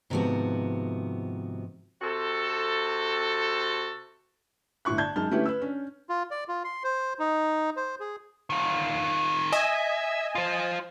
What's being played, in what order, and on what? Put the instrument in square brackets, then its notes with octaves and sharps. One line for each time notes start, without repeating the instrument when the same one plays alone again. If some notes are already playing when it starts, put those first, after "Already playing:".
[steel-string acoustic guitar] G#2 C3 D#3 F3 B3 F#4
[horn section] C3 C4 F#4 A4
[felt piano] G1 A2 E4 C#6 F#6
D5 A5 G6 G#6
F#2 G#3 D#4 A5 F6
D3 A3 C#4 E4 G4 B4
B4 E6
C#4 D4
[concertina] F4
D5
F4
C6
C5
D#4
C5
G#4
[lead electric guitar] D#3 F4
[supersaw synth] D#5 G#5 [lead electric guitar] E5
[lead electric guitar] F4 C5